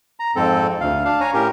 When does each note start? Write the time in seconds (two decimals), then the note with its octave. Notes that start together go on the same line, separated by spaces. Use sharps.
0.20 A#5
0.36 F2 G#2 C4 A4
0.81 D2 F5
1.05 D4 F5
1.20 C#5 G#5 A#5
1.34 A2 C#4 G4 A#4